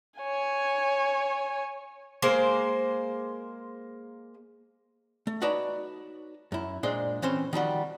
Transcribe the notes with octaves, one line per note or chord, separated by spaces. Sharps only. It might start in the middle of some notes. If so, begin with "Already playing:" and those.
C#5 G#5
G#3 A#3 C5
A3
D#4 F#4 B4 C#5 D5 A5
F#2 E4
A#2 G#3 D4 C5 D5 C6
E3 C4 C#4 C5
D#3 F3 G3 F#4